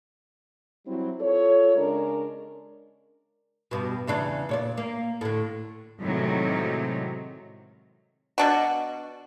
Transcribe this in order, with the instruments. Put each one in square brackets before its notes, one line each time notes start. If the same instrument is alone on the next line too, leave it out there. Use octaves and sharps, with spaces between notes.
[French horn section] F#3 G3 C4 E4
F4 A4 C#5
C#3 G#3 D4 A#4
[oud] G2 B2
E2 C#3 D4
A#2 C#5 D5
A#3
A2 D3
[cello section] A2 C3 D#3 F#3 G#3
[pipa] B2 D4 F#4